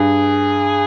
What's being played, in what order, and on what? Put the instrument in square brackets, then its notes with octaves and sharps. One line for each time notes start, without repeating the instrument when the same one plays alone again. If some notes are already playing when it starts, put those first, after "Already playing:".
Already playing: [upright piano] G2 [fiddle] G#4